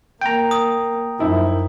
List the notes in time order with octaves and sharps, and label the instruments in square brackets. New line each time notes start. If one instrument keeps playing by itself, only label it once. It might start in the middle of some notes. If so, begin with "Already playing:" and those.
[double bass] A#3 [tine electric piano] G5 A#5
[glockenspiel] D#6
[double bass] F#2 [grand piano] F3 D#4 E4